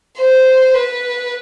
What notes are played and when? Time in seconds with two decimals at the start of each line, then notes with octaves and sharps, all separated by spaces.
0.18 C5
0.75 B4